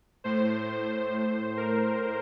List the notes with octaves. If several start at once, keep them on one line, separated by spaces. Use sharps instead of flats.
A2 C5
A2
A#4